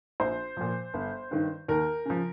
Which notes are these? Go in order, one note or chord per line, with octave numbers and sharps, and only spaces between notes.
A#1 C5
A#2 F3
G1
G2 D#3
D#2 A#4
C#3 F3